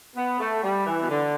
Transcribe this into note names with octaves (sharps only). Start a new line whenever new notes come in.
B3
A3
G3
E3
B2
D3